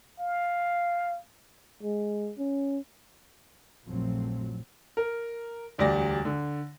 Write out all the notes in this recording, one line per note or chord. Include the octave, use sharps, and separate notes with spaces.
F5
G#3
C#4
A#1 F#2 F3 F#3 A3 C4
A#4
E1 D2 G3 D5 A#6
D3